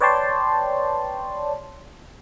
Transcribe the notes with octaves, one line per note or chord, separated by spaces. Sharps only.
B4 C#5 D5 G5 A5 C6